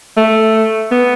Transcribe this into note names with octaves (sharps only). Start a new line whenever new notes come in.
A3
B3